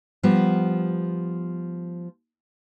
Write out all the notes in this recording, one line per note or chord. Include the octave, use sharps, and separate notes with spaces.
F3 G3 B3